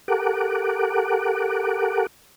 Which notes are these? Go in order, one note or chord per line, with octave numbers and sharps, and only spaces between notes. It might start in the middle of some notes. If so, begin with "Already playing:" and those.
G4 A4 A#4 F#5 D6